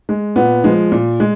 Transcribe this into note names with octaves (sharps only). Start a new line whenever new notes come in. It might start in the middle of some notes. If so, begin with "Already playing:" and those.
G#3
A#2 B3
F3 G#3
A#2
G#3